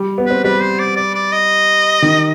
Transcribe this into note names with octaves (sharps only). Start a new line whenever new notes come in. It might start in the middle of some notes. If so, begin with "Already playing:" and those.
Already playing: G3
B3
C4 B4
G3 B4
C5
D5
D5
D5
D#5
D#3